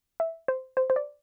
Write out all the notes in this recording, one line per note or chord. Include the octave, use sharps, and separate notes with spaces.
E5
C5
C5
C5
D5